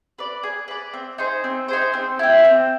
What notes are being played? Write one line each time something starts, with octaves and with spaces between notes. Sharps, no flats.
B4 D5
G#4
B4 D5
C4
D#4 G#4 C5
C4
D#4 G#4 C5
C4
E4 G4
C4